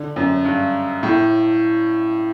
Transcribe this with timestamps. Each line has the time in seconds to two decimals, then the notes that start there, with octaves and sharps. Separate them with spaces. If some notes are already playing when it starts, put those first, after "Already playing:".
Already playing: D3
0.16 F#2
0.45 G2
1.03 A2